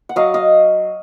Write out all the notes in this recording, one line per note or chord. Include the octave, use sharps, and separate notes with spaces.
F#5
F#3 D#5 F5
D#5 F5